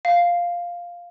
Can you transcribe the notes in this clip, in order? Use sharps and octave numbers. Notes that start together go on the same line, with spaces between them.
F5